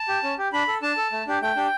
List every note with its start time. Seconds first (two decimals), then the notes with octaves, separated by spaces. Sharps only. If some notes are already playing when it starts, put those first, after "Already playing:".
Already playing: A5
0.08 G4
0.23 C#4
0.38 G4
0.53 D4 B5
0.68 A4
0.82 D4 A5
0.97 A4
1.12 A3
1.27 D4 G4
1.42 A3 G5
1.56 D4 G4